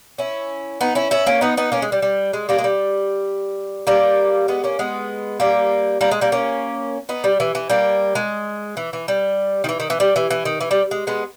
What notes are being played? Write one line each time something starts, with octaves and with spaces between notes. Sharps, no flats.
C#4 E4
B3 D#4
C#4 E4
C#4 E4
A#3 C#4
B3 D#4
B3 D#4
A#3 C#4
G#3
G3
G3
G#3
G3 A#3
G#3
G3
G3 A#3
G#3 B3
A#3 C#4
G#3 B3
G3 A#3
G3 A#3
G#3
G3 A#3
A#3 C#4
B3 D#4
G3
E3
E3
G3 A#3
G#3
E3
E3
G3
D#3
E3
D#3
E3
G3
E3
E3
D#3
E3
G3
G#3
G#3 B3